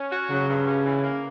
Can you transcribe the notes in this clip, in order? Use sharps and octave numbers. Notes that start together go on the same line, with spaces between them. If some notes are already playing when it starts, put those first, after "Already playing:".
Already playing: C#4
F#4
C#3 F#3
G2
C#4
E3
A#3